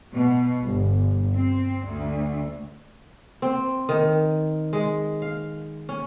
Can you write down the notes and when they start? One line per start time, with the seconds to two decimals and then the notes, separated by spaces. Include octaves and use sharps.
0.14 B2
0.61 G1
1.34 C4
1.85 D2
3.42 C4
3.89 D#3
4.73 G#3
5.22 F5
5.89 C#4